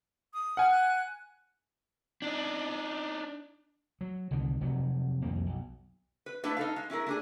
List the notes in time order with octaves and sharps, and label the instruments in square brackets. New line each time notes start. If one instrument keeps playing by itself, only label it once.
[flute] D#6
[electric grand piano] F#5 G#5 [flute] F6
[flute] F#6
[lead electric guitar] D4 D#4
[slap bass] F#3
C2 D3 D#3
F1 C3 F#3
C2 F2 D#3 A#3
B1
[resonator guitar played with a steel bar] B4
A3 D4 E4 B4
D#4 A4 F5
G#3
C#4 E4 G#4 A#4
A3 D4 G#4